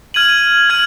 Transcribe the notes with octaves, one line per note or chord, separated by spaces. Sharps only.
F6 G#6 D#7 F#7
F6 G#6 D#7 F#7